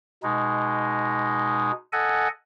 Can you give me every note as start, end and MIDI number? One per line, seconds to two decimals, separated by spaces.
0.23 1.72 47
0.23 1.72 56
0.23 1.72 63
1.93 2.28 69
1.93 2.28 75
1.93 2.28 78
1.93 2.28 80